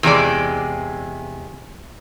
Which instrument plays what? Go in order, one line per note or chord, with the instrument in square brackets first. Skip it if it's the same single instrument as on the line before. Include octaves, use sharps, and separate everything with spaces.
[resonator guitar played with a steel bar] E2 C3 G#3 D5